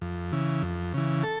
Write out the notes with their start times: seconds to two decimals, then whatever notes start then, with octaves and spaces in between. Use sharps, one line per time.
0.01 F2
0.32 C#3 E3
0.63 F2
0.94 C#3 E3
1.23 A4